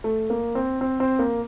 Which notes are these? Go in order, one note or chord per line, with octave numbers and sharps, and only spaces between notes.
A3
A#3
C4
C4
C4
A#3